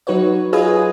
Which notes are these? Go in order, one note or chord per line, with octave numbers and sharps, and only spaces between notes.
F#3 D#4 F#4 B4 C#5
F4 G#4 B4 D#5 G#5 D#6